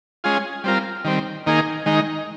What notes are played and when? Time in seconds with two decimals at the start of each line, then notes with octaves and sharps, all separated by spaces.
0.24 G#3 C#4 F4 G#4
0.64 G3 C4 F4 A#4
1.05 D#3 G3 C4
1.46 D#3 A#3 D#4 G#4
1.86 D#3 G#3 D#4